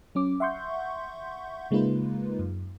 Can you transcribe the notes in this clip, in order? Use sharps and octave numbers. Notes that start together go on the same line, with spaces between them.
F#3 C#4 D6
E5 F#5 C6 C#6 G6
C#3 G#3 A#3 D#4 F4 B4
F#2